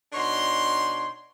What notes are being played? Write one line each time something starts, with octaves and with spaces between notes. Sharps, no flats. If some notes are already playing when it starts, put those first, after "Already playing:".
B2 D4 D#4 C#5 C6